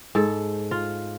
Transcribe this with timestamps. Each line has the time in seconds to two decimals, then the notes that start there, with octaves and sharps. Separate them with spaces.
0.15 G#2 A4
0.71 F4